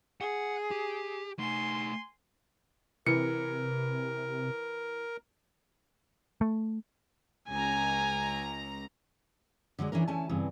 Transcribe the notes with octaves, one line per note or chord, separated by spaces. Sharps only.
G#4 F#5
G4
A3 D#4 G#5 C6
C3 E3 A#4 C#7
A3
C#2 G#5 A#5
D3 F#3 G#3 D4
E3 C#4 D4 A#4
A3 C#4 G#5 A5
E2 G2 C#3 E3 C4